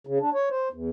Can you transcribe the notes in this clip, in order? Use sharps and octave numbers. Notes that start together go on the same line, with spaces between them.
C#3
D4
C#5
C5
E2